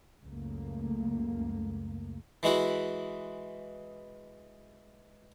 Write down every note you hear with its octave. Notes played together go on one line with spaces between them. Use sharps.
C#2 F#2 A3 A#3
E3 G#3 E4 F#4